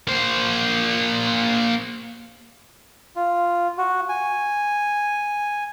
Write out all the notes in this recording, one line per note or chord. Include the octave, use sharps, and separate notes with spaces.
A#3 C5
F4
F#4
G#5